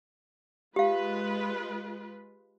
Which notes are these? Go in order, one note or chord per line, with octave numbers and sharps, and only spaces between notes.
G#3 F4 G4 B4 F5